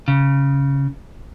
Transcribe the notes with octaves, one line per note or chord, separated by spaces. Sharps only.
C#3